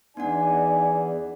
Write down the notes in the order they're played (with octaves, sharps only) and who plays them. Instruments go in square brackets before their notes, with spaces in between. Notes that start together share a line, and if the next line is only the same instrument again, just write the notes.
[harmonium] E2 [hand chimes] B3 D4 F#5 [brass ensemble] D#4 D5 G#5